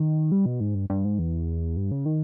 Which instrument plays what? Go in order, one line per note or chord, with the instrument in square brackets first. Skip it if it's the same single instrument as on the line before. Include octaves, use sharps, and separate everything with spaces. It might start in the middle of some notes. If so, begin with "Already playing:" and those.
Already playing: [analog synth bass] D#3
G3
B2
G#2
G2
G2
G#2
E2
G2
C#3
D#3